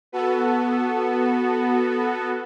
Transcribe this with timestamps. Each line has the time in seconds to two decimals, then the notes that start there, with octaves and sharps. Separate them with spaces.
0.12 B3 F#4 A4